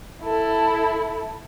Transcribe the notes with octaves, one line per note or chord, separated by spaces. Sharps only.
E4 A4